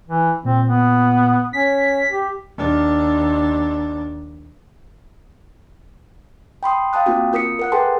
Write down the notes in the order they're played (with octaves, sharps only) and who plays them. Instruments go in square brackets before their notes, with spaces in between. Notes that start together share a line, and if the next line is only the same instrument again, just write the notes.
[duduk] E3
[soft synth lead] A#2 [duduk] C4
[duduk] B3
[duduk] C#4 [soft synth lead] B6
[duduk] G4
[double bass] D#2 D4
[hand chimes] G5 B5 C6 D#6
F5 G5 A5 D#6 F#6
A#3 C4 F4 F#4
F4 A#4 D#6 B6 C#7
A#4 F#5 F#6
G#4 A4 B4 G5 A5 C6